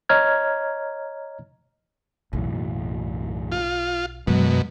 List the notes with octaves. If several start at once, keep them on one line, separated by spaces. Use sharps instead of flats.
C#5 D#5 A#5 F6 G#6
B1 F#2 A2 E3
F4
F#2 B2 E3 F#3 G#3